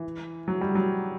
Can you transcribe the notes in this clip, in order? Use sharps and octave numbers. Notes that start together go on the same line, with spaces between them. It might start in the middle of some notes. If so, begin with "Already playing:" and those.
Already playing: E3
F#3
G3
F#3